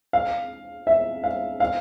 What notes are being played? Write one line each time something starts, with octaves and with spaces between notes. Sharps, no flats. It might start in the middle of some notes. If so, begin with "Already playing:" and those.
F5
E5
F5
F5